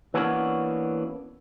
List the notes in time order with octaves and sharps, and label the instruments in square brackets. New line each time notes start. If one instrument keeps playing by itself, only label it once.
[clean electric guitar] E3 A#3 B3 C#4 D4 F#4